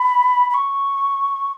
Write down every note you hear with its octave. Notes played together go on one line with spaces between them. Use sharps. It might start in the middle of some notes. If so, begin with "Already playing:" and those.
Already playing: B5
B5
C#6